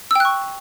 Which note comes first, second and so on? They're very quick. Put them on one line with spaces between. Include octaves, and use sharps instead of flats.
E6 G5 F#6 C#6